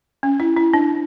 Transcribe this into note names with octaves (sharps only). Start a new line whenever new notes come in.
C#4
E4
E4
D4